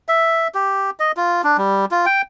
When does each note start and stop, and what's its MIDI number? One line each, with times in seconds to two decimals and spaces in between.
0.08 0.48 76
0.55 0.90 67
1.00 1.12 75
1.17 1.42 65
1.44 1.57 62
1.57 1.85 55
1.91 2.06 65
2.06 2.22 79